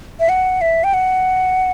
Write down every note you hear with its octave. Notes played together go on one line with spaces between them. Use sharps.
E5
F#5
E5
G5
F#5